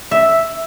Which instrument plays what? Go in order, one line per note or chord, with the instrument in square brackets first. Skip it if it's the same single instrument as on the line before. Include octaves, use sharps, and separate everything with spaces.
[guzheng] E5